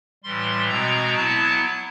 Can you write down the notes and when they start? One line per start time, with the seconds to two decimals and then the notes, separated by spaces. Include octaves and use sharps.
0.24 A2 E3 G3 C6
0.69 B2 G#3 C4 A#5
1.15 F#3 B3 E4 A5